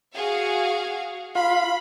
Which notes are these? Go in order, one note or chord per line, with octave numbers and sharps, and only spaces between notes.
F#4 G#4 F5
F4 F5 B5 C6